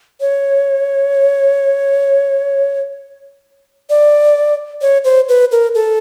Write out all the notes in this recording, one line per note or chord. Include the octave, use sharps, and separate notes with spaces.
C#5
D5
C#5
C5
B4
A#4
A4